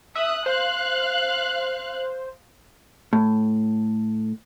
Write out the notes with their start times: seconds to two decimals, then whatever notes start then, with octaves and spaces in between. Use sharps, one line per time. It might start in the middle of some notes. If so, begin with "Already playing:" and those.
0.15 E5 D#6 F#6
0.46 C5 F5 F#6
3.13 A2